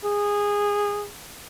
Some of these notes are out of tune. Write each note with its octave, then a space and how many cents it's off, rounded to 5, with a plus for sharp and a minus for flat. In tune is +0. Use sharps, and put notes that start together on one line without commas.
G#4 -20